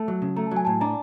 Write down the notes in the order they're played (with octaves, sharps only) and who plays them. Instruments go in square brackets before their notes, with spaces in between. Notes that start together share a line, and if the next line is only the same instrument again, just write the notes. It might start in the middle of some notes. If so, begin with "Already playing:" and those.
Already playing: [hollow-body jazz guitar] A3 [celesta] A5
[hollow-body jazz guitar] F#3
C#3
[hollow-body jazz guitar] A3 [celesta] A#5
[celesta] A5
[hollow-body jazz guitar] F#3
[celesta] G#5
[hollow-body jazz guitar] A2 [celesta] A5
[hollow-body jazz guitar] D4 [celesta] A#5